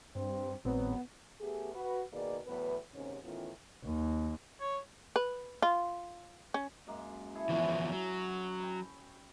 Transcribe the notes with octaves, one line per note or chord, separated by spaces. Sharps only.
G2 C4
G#1 A2 F#3 B3 C4
A3 B3 G4 G#4
F#4 B4
B2 D#3 A#3 G#4 D5
E2 A2 F#3 B3 B4
D#2 G#2 C3 C#4
A2 D#3 E3 B3 C#4 F4
D#2
C#5
B4
F4
C#4
F#2 G#3 A#3
E4 G#4 A4
E3 F3 B3 C#4 E5
F#3
G5 B5